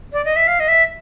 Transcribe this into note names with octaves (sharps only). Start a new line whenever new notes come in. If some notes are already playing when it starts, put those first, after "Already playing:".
D5
D#5
E5
F5
D#5
E5